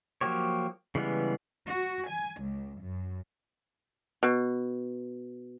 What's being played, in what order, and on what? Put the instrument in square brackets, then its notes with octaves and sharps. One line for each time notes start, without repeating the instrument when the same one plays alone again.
[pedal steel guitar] F3 F#3 A#3 G4 C#5
C#3 E3 G3 G#3 B3
[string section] F#4
G#5
C#2
F#2
[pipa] B2